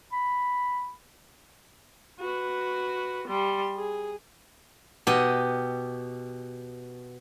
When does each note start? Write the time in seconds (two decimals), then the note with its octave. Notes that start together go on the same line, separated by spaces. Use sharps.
0.12 B5
2.20 F#4 B4
3.28 G3 C6
3.76 G#4
5.07 B2 G4 D#5